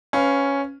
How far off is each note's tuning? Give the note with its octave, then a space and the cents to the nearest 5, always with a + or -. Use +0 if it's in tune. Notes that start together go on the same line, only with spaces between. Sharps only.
C#4 +0 B4 +20 F5 +0